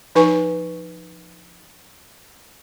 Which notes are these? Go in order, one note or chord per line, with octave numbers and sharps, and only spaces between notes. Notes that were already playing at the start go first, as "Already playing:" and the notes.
F3 D#4 B4 G#5 C#6